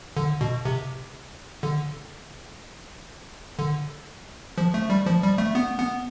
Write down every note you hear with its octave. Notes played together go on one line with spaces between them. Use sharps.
D3
B2
C3
D3
D3
F3
A3
G3
F3
G3
A3
B3
B3